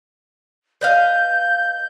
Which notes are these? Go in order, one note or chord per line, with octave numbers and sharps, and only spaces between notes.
B4 D#5 F5 G6